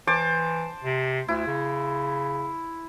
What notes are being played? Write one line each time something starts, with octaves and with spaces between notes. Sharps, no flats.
E3 C5 A5 D6
C3
D2 E4
C#3